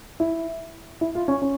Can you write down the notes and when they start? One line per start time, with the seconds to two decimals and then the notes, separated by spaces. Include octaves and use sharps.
0.20 E4
1.01 E4
1.15 F4
1.28 C#4
1.42 C#4